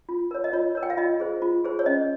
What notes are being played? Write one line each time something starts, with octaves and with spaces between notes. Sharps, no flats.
F4
A#4 C#5
D#5
F4 C#5
A#4 C#5
G5
F5
F4 D#5
G#4 C5
F4
G#4 C5
C#5
C#4 D#5